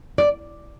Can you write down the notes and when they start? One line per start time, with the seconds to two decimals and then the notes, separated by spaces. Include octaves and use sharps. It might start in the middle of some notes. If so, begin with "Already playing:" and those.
0.18 D5